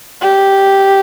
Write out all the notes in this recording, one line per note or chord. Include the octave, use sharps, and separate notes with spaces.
G4